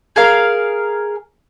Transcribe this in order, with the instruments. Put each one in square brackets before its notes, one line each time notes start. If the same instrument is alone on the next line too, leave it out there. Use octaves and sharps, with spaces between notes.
[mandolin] G#4 A#4 F5